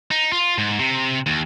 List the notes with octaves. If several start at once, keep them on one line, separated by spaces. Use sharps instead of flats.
D#4
F4
G#2
C3
D#2